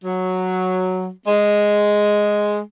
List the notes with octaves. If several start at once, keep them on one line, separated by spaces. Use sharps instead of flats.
F#3
G#3